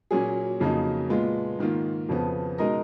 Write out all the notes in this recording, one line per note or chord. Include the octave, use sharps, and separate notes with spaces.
A#2 F#3 A#3 C#4 G#4
F2 C#3 F#3 A#3 D#4
A#2 G#3 B3 F4
G#2 D#3 A#3 F4
F2 C#3 F3 B3
B2 G#3 D#4 A#4 D#5